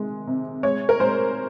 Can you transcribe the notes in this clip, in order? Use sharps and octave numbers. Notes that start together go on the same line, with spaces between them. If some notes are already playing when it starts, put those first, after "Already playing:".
Already playing: C3 D#3 G#3
C3
G#3 C#5
A#4
G#3 C5